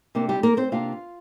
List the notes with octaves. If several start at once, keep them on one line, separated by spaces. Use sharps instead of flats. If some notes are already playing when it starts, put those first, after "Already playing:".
C3 A#3 D4
G3 G4
A#3 A#4
C4 C5
C3 A#3 D4 F4 F5